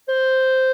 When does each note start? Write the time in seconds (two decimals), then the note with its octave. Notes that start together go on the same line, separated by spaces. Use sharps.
0.09 C5